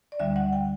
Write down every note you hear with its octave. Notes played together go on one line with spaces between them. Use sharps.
D5
D2 D3 G3 E5
F#5
G5